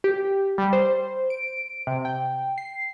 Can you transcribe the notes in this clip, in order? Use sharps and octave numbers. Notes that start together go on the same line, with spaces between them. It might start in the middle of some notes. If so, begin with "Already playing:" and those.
G4
G3
C5
D7
C3
G5
C7